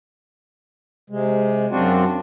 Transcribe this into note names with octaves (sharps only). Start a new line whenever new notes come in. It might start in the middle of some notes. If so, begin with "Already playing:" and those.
C3 G#3
F#2 C4 D4 F4 F#4